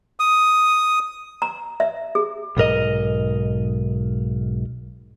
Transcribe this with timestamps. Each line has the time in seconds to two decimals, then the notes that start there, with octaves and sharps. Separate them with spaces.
0.20 D#6
1.42 A#5
1.80 E5
2.15 G#4
2.57 B1 G#2 A#4 D#5